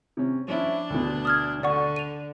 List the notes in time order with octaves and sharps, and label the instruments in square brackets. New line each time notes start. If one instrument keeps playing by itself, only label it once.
[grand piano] C3 C#4
[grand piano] F3 C#4 E4 [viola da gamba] D4
[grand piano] D2 B2
[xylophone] D#6 F6 G#6
[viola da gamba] D3 [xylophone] D5 F#5 C#6
[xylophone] D#7 F7